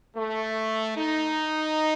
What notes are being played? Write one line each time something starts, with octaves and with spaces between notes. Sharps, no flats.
A3
D#4